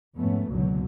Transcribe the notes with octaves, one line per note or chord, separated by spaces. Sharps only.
F2 G#2 A3 B3 C#4
F#1 C#2 B2 D3 F#3